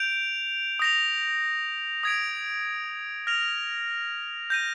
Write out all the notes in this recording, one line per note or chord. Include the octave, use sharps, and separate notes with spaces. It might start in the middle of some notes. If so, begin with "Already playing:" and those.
Already playing: G6 D7 F7
D#6 A#6 F7
D#6 G#6 D7
F6 A#6 F7
G6 A#6 D#7